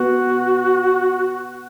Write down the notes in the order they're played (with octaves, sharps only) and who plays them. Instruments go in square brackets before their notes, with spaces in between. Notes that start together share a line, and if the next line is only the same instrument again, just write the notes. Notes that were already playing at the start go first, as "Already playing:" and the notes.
Already playing: [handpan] B3 [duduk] F#4